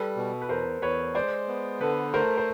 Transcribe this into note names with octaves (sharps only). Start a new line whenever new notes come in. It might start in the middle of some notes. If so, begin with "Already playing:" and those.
Already playing: G3 A4 B4
B2
B4
E2 A#4 C5
E2 B4 C#5
G#3 C5 D5
B3
D3 A4 B4
A3 A#4 C5
C5